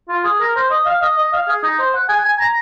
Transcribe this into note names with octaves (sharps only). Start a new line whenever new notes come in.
F4
G#4
A#4
C5
D#5
F5
D#5
D#5
F5
G#4
D#4
C5
F#5
G#5
G#5
A#5